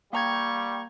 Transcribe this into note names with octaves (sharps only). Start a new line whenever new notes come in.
G3 A#3 G5 A#5 C#6 G#6